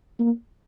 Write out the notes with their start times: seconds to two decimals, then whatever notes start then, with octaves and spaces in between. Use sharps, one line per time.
0.19 A#3